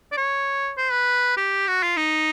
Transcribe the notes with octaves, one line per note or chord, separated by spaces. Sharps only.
D5
C#5
C5
B4
G4
F#4
F4
D#4